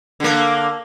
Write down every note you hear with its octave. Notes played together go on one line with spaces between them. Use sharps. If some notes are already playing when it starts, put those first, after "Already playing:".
D3 A#3